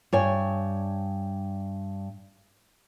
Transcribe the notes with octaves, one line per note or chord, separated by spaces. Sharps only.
G2 C#5 G#5